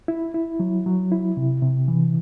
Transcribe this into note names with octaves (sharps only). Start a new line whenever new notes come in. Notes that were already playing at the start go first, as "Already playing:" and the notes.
E4
E4
F#3
F#3
E4
C3
C3
E3